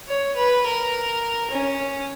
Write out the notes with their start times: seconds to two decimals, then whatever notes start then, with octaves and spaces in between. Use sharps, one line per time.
0.08 C#5
0.36 B4
0.66 A#4
1.51 C#4